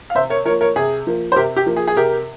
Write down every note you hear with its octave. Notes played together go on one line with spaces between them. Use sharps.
F5
C3 C5 E5
A#4 C#5
F3 A#3 A#4 C#5
A#4 C#5
C3 G#4
F3 A#3
C5
C3 G4 A#4
G4
F3 A#3
G#4
G#4
C3 G4 A#4